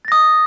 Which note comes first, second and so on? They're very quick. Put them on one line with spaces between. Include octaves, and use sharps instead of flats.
A6 A#6 D#6